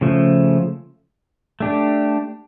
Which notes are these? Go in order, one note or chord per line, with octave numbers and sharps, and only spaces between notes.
C#3 F3 A3
A3 D4 G4